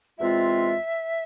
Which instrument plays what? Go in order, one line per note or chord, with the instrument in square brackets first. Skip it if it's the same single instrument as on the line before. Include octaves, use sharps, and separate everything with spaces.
[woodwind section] E2 C3 G#3 C4 F4 [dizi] E5